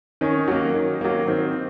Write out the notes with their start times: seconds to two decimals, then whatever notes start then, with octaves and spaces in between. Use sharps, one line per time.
0.21 D#3 C#4
0.48 F#3 A#3
0.74 D#3
1.01 F#3 A#3
1.28 D#3 C4